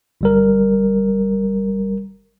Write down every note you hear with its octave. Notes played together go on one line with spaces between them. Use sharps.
G1 G3 A#4